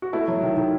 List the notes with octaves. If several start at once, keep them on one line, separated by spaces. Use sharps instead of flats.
F#4
A3 E4
F#3
D#3
D#3